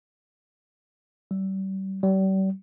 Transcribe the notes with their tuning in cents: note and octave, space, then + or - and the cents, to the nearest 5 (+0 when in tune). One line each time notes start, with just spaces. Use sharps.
G3 -35
G3 -40